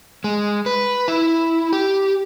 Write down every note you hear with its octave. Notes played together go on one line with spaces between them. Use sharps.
G#3
B4
E4
G4